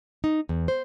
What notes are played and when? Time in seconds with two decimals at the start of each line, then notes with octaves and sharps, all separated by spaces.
0.24 D#4
0.49 E2
0.68 C5